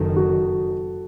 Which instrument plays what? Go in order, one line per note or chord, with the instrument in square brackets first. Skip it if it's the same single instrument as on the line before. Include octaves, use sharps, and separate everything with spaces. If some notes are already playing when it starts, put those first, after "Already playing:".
Already playing: [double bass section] F#1 F#2 D#3 [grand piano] A4
[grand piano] F#4